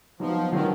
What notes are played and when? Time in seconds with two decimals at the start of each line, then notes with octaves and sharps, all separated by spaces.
0.20 F3 F#3 B3 D#4 F#4
0.52 D3 D#3 F#3 B3 D4